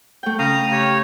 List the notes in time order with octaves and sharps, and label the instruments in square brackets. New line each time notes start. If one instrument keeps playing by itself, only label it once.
[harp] A3 G5
[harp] C#3 [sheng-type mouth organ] F5 A#5 D#6
[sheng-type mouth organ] G4 C#5